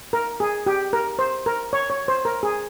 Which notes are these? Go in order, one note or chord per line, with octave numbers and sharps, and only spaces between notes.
A#4
G#4
G4
A#4
C5
A#4
C#5
C#5
C5
A#4
G#4